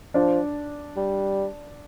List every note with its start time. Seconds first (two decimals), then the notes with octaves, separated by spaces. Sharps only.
0.14 F3 D4
0.97 G3